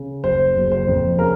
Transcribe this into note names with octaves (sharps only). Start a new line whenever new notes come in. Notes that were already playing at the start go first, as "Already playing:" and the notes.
Already playing: C#3
F#1 C5
F#1
C5
F2
C#3 A#4